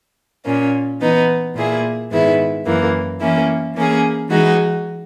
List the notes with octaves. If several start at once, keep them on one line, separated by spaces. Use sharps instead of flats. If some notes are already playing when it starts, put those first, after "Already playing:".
A#2 A#3 C#4
E3 B3 D#4
A#2 A#3 E4 G#4
G#2 D#3 G#3 B3 E4
F#2 E3 A#3
E3 A#3 C#4 E4
E3 A#3 C#4 G#4
E3 G#3 D#4 F#4